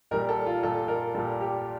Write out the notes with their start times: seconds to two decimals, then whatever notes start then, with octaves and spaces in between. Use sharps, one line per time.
0.11 A#2 G3 A#4
0.29 A4
0.46 F4
0.63 A#2 G3 A4
0.88 A#4
1.15 A#2 G3 A4
1.41 G4